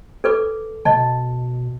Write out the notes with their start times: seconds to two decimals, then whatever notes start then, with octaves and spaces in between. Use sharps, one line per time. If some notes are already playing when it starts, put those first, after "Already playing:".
0.24 A4 B4 D6
0.85 B2 D#5 A5